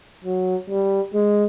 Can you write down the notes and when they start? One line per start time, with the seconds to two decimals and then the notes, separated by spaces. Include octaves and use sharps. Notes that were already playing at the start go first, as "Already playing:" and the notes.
0.24 F#3
0.70 G3
1.14 G#3